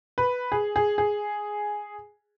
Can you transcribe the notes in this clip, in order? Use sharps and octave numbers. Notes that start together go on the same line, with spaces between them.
B4
G#4
G#4
G#4